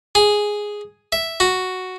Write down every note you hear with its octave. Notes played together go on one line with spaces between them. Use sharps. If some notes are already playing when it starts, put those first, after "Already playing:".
G#4
E5
F#4